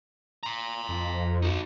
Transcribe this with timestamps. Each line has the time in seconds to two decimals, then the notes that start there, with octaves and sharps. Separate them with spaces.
0.43 A#5 C6
0.89 F2
1.42 D#4 F#4